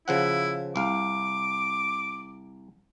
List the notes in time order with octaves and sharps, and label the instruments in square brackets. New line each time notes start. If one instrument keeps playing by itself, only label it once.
[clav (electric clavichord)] C#3 F3 F#5 [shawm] E4
[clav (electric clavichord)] C2 F5 [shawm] D6